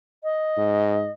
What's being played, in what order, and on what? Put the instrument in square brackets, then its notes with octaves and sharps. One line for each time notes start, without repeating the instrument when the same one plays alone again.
[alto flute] D#5
[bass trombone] G#2